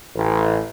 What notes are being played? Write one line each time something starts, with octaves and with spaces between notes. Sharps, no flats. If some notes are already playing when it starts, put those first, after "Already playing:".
A1